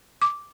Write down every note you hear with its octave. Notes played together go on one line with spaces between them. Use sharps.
D6